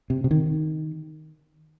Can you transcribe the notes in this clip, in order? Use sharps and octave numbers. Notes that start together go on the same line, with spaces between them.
C3
C3
D#3